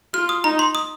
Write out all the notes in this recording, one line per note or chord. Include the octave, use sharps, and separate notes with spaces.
F4 F6
D#6
D#4 A#5
C6
D#6